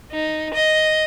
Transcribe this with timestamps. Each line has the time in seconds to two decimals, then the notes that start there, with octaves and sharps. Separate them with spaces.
0.11 D#4
0.53 D#5